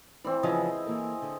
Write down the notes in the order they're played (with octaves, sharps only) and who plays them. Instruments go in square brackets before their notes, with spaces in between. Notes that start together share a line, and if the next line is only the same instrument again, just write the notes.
[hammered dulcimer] E3 C4 [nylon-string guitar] D5
[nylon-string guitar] C#3 E3 F3 [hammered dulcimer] G#4 D#5
[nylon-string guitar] E4
E3 A#3 A4
D3